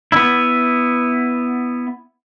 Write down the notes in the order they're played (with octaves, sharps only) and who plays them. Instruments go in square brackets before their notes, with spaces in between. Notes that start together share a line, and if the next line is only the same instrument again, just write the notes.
[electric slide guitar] B3 E4